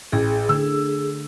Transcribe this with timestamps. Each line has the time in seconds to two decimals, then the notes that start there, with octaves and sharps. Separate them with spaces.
0.12 A1 G#4
0.49 D3 A3 E6